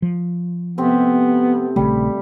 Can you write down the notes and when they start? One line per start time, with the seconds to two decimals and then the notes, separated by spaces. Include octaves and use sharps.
0.02 F3
0.78 C3 A3 B3 C4
1.76 A#1 C#3 G3 A3